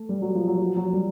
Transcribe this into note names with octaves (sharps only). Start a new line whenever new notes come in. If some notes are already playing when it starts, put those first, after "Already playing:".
Already playing: A3
G3
F#3
F3
F#3
F3
F#3
G3